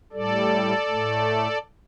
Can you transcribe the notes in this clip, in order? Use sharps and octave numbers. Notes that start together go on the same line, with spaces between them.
A2 G3 A4 D5
A2 A3